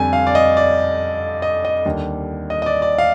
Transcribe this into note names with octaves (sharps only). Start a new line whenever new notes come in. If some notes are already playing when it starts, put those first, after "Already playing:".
Already playing: F2 D3 G3 G#5
F5
D5
D#5
D5
D#5
D#5
D#2 D3 G3
D#5
D#5
D5
D5
F5